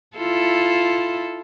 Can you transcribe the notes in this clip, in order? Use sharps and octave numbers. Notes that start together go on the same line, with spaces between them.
E4 F4 A4